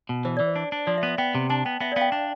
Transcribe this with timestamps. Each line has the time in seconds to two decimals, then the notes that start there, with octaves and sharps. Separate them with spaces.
0.09 B2
0.25 E3 C5
0.37 E3 D5
0.47 C5
0.56 D4
0.72 D4
0.87 F3 D5
0.98 E5
1.03 B3
1.08 E5
1.18 B3 G5
1.35 C3
1.50 D4 A5
1.65 B3 G5
1.81 B3 E5
1.92 D5
1.96 B3 F5
2.01 G5
2.12 D4 G5